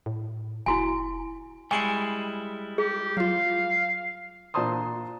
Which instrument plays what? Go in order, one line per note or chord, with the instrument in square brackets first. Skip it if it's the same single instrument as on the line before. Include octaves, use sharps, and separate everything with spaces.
[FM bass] A2
[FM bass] F1 [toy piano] E4 F#4 G#5
[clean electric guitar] G3 G#3 E4 [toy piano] G#5 [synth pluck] C#6 C7 C#7
[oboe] G4 [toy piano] G#4
[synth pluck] F#3 F4 [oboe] F5
[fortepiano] A#2 D4 C5 A5 C6 D#6